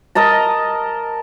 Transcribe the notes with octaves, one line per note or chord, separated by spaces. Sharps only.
A#4 D#5 A5 A#5